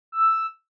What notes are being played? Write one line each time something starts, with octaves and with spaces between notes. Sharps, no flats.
E6